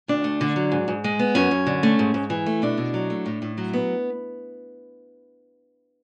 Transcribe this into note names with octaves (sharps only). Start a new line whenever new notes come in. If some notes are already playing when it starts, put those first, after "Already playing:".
D2 D4
A3
D3
F#3
G#2
G#2
G#3
B3
F#2 C#4
F#2
D3
A3
G#2
G#2
E3
A3
B2 D4
B2
F#3
A3
A2
A2
F#3
B3